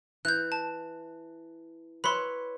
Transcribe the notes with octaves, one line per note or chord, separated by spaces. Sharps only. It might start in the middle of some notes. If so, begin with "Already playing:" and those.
E3 F#6 G6
A5
B4 C#5 E5 B5 C6